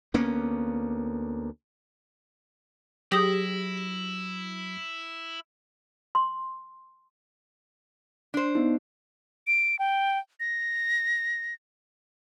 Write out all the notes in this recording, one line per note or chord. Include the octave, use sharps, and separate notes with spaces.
D2 A#3 B3 C#4
F#3 E4 G4 G#4 D#6 A#6 F#7
C6
D4 C5
B3 D#4
D7
G5
A#6